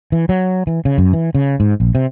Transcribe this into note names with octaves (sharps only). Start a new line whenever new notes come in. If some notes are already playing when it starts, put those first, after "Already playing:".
E3
F#3
E3
C#3
F#2
E3
C#3
G#2
A#1
C3